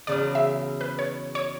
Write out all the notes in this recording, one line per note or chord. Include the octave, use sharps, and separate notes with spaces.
E2 C#3 F#3 D5
E5
B4
C#5
C#5